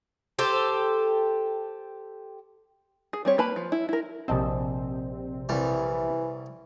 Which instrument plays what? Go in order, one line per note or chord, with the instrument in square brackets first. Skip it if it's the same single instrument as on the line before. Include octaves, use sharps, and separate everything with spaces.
[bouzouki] G4 A4 C5
[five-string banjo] G#4
G3 C4 C#5
A#3 B4 A5 B5
F3
E4
E4 A#4
[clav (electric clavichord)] A#1 D#5 A5 [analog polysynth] C3 C4
[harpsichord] C2 G3 [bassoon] E3